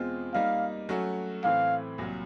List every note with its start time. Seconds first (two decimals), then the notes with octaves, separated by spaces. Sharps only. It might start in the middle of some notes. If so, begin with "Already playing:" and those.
Already playing: E2 B2 G#3 C4 F4
0.34 G3 A#3 D#4 F5
0.89 F#3 A3 C#4 F#4
1.44 A2 E3 A3 C4 F5
1.98 C2 A#2 F#3